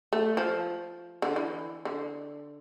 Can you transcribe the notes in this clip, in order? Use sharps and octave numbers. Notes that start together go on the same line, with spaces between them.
A3
F3
D3
E3
D3